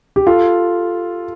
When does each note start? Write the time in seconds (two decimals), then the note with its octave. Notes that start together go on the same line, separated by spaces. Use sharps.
0.16 G4
0.27 F4 A4